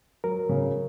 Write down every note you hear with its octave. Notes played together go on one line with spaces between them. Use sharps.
F#3 A#4
C#3